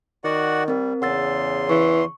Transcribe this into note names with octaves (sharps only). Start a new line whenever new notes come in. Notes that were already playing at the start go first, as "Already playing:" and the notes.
D#3 F#4 D5 F#5
G3 C4 A#4
E2 C#3 F#5 C6 E6 A6
E3 C#6